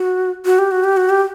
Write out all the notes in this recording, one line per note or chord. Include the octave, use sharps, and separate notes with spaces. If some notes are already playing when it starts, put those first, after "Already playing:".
Already playing: F#4
F#4
G4
F#4
G4
F#4
G4